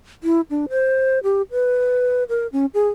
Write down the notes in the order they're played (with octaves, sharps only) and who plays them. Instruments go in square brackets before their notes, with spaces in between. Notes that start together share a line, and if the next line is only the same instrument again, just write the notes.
[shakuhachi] E4
D4
C5
G4
B4
A#4
C#4
G#4